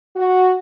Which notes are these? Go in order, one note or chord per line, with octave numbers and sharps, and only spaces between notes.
F#4